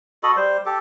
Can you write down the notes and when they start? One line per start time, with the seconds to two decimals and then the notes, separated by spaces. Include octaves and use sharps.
0.23 F#4 A4 D#5 B5
0.37 G3 C5
0.66 G4 A4